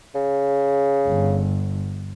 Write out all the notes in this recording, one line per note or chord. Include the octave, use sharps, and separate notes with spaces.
C#3
G1